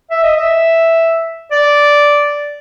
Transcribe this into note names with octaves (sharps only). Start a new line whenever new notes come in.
E5
D#5
E5
D5